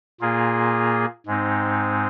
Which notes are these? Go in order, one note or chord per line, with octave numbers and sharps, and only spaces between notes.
A#2 A#3 F4 G#4
G#2 G#3 C4 D#4